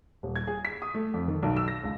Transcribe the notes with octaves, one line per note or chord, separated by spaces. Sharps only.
D#1
G#6
G#4
B6
D#6
A3
F2
D#3
B1
E6
A#6
C#2